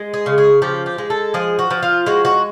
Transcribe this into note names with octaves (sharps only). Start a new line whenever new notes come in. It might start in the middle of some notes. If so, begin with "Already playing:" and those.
Already playing: G#3
G#4
C#3
G#4
F3 G4
G4
G#3
A4
F3 G#4
F#4
F3
F4
G#3 F#4
F#4